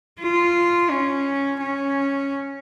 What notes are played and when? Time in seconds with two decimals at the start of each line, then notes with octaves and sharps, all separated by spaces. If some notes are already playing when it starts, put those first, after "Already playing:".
0.22 F4
0.91 C#4
1.61 C#4